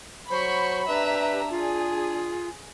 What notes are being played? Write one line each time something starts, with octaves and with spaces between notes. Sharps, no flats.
F#3 C5 B5 C#6
D4 G4 B4 E5 A#5
F4 G#4